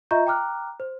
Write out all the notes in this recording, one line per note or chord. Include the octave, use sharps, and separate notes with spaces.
F4 D#5 E5 A#5 C#6 G6
G5 A#5 D6 F6 F#6
C5